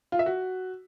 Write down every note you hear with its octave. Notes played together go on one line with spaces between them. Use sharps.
F4
E5
F#4